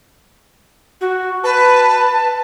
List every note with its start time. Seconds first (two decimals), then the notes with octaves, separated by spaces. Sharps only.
1.01 F#4
1.44 B4 A5